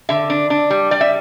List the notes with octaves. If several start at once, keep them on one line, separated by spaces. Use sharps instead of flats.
D3 E5
D4
D4
G3
G3 D5
E5